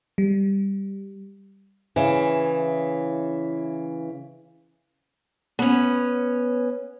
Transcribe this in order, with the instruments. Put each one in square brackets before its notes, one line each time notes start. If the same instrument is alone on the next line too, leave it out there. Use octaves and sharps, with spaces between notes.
[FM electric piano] G3
[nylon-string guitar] C#3 E3
[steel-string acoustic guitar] B3 C#4